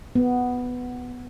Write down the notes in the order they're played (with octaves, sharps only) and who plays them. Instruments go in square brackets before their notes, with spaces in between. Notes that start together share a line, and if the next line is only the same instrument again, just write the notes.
[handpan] B3